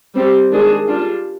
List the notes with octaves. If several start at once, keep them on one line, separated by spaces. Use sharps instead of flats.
G3 C4 G4
D#3 G#3 D4 G#4
G3 D4 F4